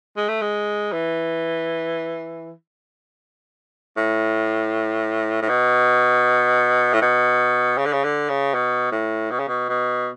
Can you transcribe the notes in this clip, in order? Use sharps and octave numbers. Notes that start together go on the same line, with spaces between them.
G#3
A3
G#3
E3
A2
A2
B2
A2
B2
C#3
D3
C#3
D3
C#3
B2
A2
B2
C#3
B2
B2